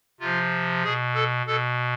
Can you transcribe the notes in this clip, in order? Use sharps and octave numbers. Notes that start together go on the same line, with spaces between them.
C3 F3 F4
B2 G#4
A4
B2 A4